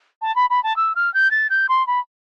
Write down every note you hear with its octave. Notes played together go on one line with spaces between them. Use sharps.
A5
B5
B5
A5
E6
F6
G6
A6
G6
C6
B5